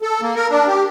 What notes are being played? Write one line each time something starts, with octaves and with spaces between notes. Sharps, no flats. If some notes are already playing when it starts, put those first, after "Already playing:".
A4
A#3
A#4
D4
G4